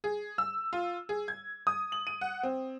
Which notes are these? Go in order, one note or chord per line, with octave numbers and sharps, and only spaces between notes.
G#4
E6
F4
G#4
G#6
D#6
F#7
D#7
F#5
C4